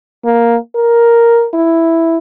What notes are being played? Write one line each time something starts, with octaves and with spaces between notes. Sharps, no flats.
A#3
A#4
E4